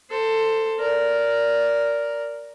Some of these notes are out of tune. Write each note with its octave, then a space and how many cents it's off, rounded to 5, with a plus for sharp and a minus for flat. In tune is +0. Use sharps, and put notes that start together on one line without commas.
A4 +15 C5 +0
A#4 +0 D5 -15